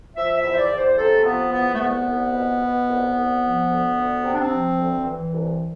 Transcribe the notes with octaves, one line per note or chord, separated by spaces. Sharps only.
F3 E5
E5
E2
C5
D5
E2
C5
C3 A4
A3
F3 B3
E2 B3
A3
C2 B3
C2
B2
B2
C2
C2
F3
D2
D2
C3 C4
D4
C4
F3
D2
E3
C2